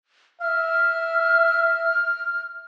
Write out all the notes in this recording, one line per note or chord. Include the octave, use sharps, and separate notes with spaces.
E5 F6